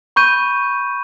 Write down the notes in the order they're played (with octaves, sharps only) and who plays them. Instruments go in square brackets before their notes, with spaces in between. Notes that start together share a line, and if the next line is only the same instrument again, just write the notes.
[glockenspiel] B5 C#6 G6 D#7